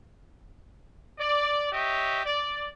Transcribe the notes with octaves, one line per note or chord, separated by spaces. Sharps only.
D5
G4 C#5 D#5 E5
D5